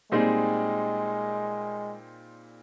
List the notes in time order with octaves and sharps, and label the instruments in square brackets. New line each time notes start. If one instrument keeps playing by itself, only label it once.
[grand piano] A#2 G3 C4 D#4 G#4 [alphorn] G#3